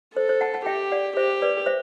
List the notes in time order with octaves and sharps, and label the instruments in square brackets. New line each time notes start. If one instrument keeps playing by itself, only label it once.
[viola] A4 [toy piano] C5
[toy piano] C5
F#5 A5
F#5 A5
[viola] G4 [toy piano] E5 G5
[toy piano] D5 F#5
[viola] G4 [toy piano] C5 E5
[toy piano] B4 D5
C5 E5